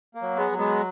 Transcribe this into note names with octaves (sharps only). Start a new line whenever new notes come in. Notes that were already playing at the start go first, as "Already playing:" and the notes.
A#3
F#3
G#3 B3
F#3
G#3 B3